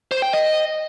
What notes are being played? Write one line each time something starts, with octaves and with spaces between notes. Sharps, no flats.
C5
G5
D#5